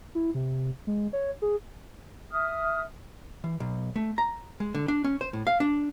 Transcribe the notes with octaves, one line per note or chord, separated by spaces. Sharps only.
E4
C3
G#3
C#5
G#4
E5 D#6 F6
E3
B1
A3
A#5
G#3
D3
D4
C#4
C5
A2
F5
D4